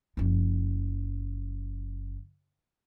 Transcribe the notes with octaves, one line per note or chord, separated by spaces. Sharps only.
F#1 F3